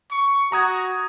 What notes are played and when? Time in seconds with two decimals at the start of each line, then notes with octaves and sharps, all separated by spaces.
0.11 C#6
0.52 F#4 A#5 D#6 G#6